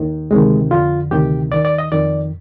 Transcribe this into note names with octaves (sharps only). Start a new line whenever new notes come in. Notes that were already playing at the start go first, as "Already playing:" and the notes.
Already playing: D#2 D#3
D2 C3 D#3 G#3
F2 D3 F4
D2 C3 D#3 G4
D#2 D#3 D5
D5
D#5
F2 D#3 D5